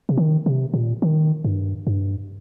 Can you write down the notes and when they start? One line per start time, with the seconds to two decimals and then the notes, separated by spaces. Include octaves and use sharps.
0.09 C3
0.17 D#3
0.46 C3
0.74 A#2
1.02 D#3
1.45 G2
1.87 G2